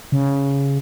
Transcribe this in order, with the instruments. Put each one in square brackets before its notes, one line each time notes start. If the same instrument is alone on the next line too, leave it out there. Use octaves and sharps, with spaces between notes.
[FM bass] C#3